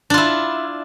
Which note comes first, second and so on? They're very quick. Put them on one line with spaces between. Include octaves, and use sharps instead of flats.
D4 F4 E4